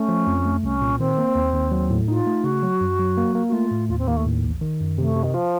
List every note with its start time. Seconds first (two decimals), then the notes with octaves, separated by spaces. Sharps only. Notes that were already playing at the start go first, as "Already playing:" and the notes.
Already playing: A3 C#4
0.08 F3
0.27 F2
0.45 A3
0.63 C2 C#4
0.81 A#2
0.99 D#3 C4
1.18 A#3
1.35 D#2
1.54 D#2
1.71 F#3
1.90 A2
2.08 D#4 F4
2.27 A3
2.44 C#3 F#4
2.63 F#3
2.81 F#2
2.99 F#3
3.17 A#3
3.35 A#3
3.48 F#4
3.53 A3 F4
3.71 A2
3.89 D#2 F4
3.98 C4
4.07 D#2 A#3
4.16 A3
4.25 A2
4.44 A1
4.61 D#3
4.80 F#2
4.98 C3 A3
5.16 C3
5.23 D#3
5.34 F3 F4